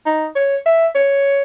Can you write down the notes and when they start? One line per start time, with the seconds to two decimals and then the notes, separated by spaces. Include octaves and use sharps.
0.06 D#4
0.35 C#5
0.66 E5
0.95 C#5